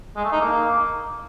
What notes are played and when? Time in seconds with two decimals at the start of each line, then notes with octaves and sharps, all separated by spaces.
0.16 G#3
0.24 A3
0.32 D#4
0.40 A#3